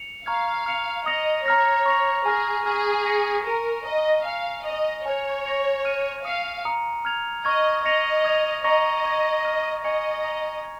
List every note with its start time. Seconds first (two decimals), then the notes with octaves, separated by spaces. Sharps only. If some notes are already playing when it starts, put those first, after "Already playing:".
Already playing: C#7 F7
0.26 F5 A#5 C#6 F6 G#6
0.66 F6 C#7 F7
1.06 D#5 D#6 A#6 C#7 F7
1.46 C#5 A#5 F6 A#6
1.86 C#6 A#6 F7
2.25 G#4 G#5 F6 A#6
2.66 G#4 G#5 C#6 F6
3.05 C#6 A#6 C#7
3.45 A#4 C#6 A#6 D#7
3.86 D#5 A#5 D#6 A#6
4.25 F5 G#5 F6 C#7 F7
4.65 D#5 G#5 C#6 A#6 F7
5.05 C#5 G#5 F6 G#6 C#7 F7
5.45 C#6 A#6 C#7 F7
5.85 F6 A#6 D#7
6.25 F5 D#6 C#7 F7
6.65 A#5 D#6 C#7
7.05 F6 G#6 F7
7.45 D#5 C#6 F6 G#6
7.84 D#5 C#6 A#6 C#7 F7
8.24 D#6 G#6 F7
8.64 D#5 A#5 C#6 A#6 C#7 F7
9.04 C#6 G#6 D#7
9.45 F6 A#6 D#7
9.84 D#5 G#5 C#6 G#6 C#7 F7
10.24 A#5 D#6 C#7 F7
10.64 C#6 G#6